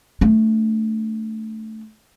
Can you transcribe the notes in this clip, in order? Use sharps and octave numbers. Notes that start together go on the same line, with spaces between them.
A3 D4